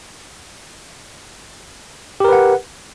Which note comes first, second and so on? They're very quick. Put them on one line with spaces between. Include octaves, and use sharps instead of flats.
G4 A#4 B4 F#5